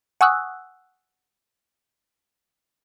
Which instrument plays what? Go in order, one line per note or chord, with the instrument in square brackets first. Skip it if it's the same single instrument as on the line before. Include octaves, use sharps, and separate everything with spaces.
[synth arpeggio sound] F#5 G#5 C#6 D#6 E6 F#6